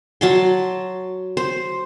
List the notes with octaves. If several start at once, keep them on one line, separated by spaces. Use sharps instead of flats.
F#3 A5 C6
C5